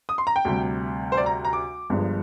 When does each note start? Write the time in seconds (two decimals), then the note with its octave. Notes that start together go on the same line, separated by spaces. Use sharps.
0.09 D#6
0.18 C6
0.27 A#5
0.36 G5
0.45 D2 C3 G3
1.12 C5
1.17 D5
1.26 A#5
1.45 A#5
1.53 D6
1.90 G1 G2 F3 G#3